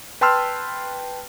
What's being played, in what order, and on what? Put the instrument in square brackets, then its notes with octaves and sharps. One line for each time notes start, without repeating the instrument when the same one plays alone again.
[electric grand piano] B4 G5 A5 C6 E6 F6